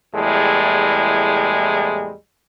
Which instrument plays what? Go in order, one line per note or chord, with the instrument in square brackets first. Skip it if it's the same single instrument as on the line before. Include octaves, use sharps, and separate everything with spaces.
[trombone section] E2 A2 G3 G#3